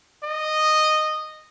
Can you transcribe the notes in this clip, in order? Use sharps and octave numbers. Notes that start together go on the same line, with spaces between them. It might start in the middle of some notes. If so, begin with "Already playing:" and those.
D#5